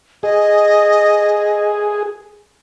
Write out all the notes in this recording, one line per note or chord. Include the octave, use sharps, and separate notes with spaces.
G#4 D#5